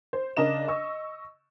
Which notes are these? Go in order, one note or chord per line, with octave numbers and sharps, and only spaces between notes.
C5
C#3 D4 A#4 D#5 E7
D#5 C#6 E6